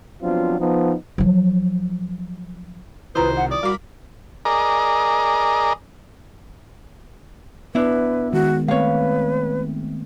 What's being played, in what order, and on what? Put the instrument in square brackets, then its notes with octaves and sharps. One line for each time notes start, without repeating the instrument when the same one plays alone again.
[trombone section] F3 F#3 B3 C4 D4 F4
F3 B3 D#4
[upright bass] F3 F#3
[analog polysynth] C2 C3 D#3 [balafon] E4 F4 A#5 [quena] B4 [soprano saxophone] C5
[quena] F#5
[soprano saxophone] D5 [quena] D#6
[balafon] G3 D6 [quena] F#4 [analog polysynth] A#4 B5
[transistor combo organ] G#4 A#4 D5 D#5 A#5
[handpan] B3 [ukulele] D4 E4 [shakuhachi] B4
[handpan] D#3 G#3 [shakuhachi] F#4
[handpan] A3 C4 [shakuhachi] B4 [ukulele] C#5 F5